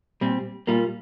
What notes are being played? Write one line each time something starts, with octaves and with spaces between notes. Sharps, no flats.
A#2 G3 C4
A#2 G3 A#3 F4